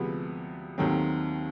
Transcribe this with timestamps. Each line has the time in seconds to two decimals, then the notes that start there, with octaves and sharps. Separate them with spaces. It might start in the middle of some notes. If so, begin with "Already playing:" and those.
Already playing: D2 C3 F3 G#3 B3
0.78 D#2 D#3 F#3 A3 C4